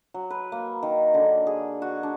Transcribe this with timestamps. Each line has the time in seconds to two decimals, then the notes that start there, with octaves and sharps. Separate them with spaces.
0.14 F#3
0.30 B4
0.52 A#3
0.83 D#3
1.14 D3
1.47 G#4
1.82 F#4
2.03 D4